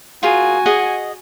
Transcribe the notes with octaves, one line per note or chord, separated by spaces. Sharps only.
F4 F#4 G#4 A#4 G#5
G#4 D#5 F#5